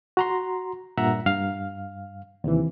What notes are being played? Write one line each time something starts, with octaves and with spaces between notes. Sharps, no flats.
F#4 A#5 C6
G2 A#2 E5 F#5 A#5
G2 F5
D#2 C3 E3